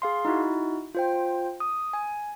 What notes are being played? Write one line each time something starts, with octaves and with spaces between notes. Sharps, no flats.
G#4 F5 C6
D#4 E4 F#4
F4 C5 G5
D#6
G#5